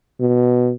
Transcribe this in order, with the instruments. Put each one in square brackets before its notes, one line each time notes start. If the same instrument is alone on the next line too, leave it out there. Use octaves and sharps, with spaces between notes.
[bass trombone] B2